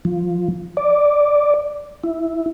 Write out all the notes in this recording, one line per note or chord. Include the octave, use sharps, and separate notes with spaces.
F3
D5
E4